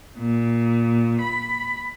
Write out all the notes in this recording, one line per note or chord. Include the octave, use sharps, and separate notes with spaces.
A#2
B5